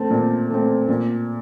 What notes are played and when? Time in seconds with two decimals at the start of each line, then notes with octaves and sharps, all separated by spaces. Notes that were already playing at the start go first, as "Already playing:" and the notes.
Already playing: A3 C4 A5
0.11 A#2
0.50 A3 C4
0.88 A#2